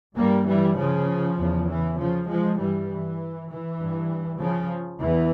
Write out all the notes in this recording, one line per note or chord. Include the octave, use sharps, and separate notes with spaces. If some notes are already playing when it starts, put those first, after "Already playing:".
G2 G3 A#3
E3 G3
C#3 F3
E2 C#3
E3
C#3 F3
F3 G#3
G2 E3 G3
E3
E3
G2
C#3 F3
E2 E3